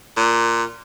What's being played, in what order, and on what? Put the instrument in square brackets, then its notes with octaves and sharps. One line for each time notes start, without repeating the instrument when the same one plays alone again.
[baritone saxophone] A#2